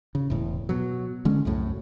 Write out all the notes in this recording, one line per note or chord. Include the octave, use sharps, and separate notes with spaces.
C#3
E1 A2
B2 F#3
D3 G#3 C#4
C2 F#2 A2